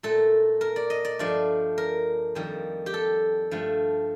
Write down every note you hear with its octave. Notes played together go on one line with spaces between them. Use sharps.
A#2 A3 A4
A#4
D5
D#5
D5
G2 F3 A3 D5
A#4
F2 D#3 G3
G4
A4
G2 F3 A3